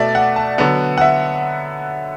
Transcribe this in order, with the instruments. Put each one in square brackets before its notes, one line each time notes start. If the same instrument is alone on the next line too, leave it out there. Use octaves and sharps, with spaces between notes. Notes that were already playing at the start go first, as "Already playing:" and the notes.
Already playing: [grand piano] B2 A3 D5 E5
F#5
A5
D3 F#3 B3 F#5
F#5
E5